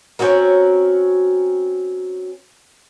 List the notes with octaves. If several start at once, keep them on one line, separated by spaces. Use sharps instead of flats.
C4 C#4 F#4 A#4